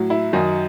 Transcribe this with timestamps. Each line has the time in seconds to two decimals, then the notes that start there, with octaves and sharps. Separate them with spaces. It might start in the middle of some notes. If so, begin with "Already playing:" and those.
Already playing: A2 F#3
0.10 E4
0.33 F#2 D#3 F#3 D#4